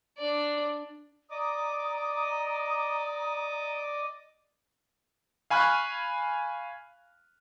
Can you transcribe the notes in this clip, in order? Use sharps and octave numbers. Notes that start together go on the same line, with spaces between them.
D4 D5
D5 D#5 A#5 D6 D#6
F5 G#5 B5 C#6 F6 F#6